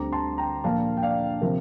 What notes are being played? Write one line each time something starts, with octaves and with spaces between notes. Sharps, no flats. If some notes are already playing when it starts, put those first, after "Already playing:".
Already playing: D2 D3 G3 C4 A#5 D6
A5 C6
G5 A#5
A#2 F3 A#3 D4 F5 A5
G5
D5 F5
C3 F3 A#4